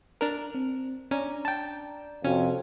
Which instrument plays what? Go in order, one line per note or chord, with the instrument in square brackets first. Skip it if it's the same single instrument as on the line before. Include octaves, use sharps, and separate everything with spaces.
[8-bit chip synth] D4 A#4
[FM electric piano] C4
[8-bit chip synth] C#4 [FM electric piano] D4 D5 A#5
[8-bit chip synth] G5 A5
[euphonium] F2 [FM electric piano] C3 F#4 [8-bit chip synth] C#4